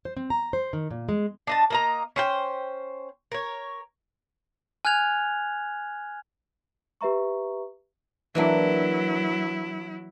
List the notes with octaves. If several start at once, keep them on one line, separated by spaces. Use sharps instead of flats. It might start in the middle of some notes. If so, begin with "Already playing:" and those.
C5
C4
A#5
C5
D#3
A#2
G#3
D4 D#5 A5
A#3 D#5 A#5
C#4 C5 G5
A#4 C#5
G#5 F6 F#6 G#6 F7
G4 B4 E5 A#5 C#6
E3 F#3 A#3 D4 E4